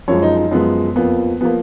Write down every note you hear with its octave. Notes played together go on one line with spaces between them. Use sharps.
F#2 F3 G#3 C#5
D#4
D#4
F#2 F3 G#3 B3
F2 F3 A#3 B3
F3 A#3 B3